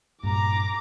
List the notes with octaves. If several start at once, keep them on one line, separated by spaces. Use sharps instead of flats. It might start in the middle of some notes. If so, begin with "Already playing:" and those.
G2 A#2 A#5 D6